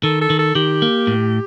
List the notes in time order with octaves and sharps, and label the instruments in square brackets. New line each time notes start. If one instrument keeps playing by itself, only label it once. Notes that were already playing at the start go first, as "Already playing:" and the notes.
[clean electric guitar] D#3 [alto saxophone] A4
[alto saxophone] A4
[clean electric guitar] D#3
[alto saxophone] A4
[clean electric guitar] D#3 [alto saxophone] G4
[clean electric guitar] A#3
A2